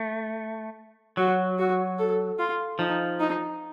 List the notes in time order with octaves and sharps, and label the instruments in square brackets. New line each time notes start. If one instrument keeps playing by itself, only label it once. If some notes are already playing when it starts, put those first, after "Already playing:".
Already playing: [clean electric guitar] A3
[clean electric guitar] F#3 [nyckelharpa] F#4
[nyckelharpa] F#4
A4
F4
[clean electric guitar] F3 [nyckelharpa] D#4
[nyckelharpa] D#4